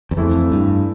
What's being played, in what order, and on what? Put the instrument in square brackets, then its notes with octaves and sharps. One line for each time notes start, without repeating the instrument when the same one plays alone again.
[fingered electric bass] E2
[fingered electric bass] F2 [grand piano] E3 A3 E4
[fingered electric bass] G2